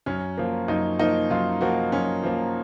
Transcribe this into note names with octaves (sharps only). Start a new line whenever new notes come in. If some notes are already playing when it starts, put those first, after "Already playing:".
F#2 C#4
F3 A#3
F#2 D#4
F3 A#3 D#4
F#2 F4
F3 A#3 F#4
F#2 C#4
F3 A#3